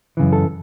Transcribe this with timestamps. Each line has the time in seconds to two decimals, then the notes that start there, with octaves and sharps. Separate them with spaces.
0.17 F#2 C#3 E3
0.33 A4